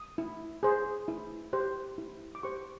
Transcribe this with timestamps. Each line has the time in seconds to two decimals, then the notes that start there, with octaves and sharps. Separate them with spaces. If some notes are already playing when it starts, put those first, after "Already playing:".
Already playing: D#6
0.18 E4
0.63 G#4 C5
1.08 E4
1.53 G4 C5
1.98 E4
2.35 D6
2.43 G4 C5 C#6